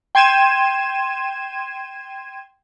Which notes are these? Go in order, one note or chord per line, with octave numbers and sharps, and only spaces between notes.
G5 C6 G#6 D#7 E7